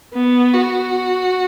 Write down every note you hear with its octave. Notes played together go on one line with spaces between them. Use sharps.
B3
F#4